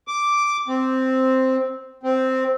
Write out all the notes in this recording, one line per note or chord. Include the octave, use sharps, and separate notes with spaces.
D6
C4
C4